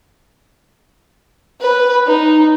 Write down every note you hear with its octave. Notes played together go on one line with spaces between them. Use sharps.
B4
D#4